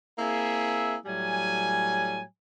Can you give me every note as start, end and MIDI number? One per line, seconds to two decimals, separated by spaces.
0.19 0.96 58
0.19 0.96 60
0.19 0.96 64
0.19 0.96 68
0.19 0.96 76
1.06 2.23 45
1.06 2.23 54
1.06 2.23 55
1.06 2.23 80